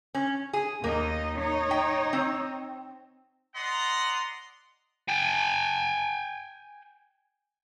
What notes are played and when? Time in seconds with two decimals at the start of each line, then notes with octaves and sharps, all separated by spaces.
0.15 C#4
0.53 G#4
0.84 D#2 A#3 D#4 D#5
1.36 D#4 C#5
1.71 G5
2.13 C4
3.55 D5 D#5 F#5 A#5 C6
5.09 G5 G#5